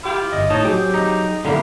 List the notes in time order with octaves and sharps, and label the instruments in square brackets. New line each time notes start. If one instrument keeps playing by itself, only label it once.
[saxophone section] E4 F4 G4
[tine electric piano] G1 D#5
[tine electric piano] A2 C#5 A5 [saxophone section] D#4
[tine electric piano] F#3 G#4 [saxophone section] C4 G4
[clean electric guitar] D#4
[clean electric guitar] D3 G3 A#3 [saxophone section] B3 E4